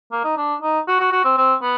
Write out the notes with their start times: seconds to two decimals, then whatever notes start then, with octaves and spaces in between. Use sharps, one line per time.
0.12 A#3
0.24 D#4
0.37 D4
0.62 D#4
0.87 F#4
1.00 F#4
1.12 F#4
1.24 C4
1.37 C4
1.62 B3